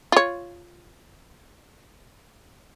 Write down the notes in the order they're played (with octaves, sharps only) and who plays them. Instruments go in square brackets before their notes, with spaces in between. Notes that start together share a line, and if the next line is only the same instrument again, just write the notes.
[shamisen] F4 C#5